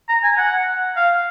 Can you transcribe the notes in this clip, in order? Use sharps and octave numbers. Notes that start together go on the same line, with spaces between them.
A#5
G#5
F#5
F5